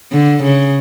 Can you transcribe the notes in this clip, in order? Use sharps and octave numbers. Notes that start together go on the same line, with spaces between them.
D3
C#3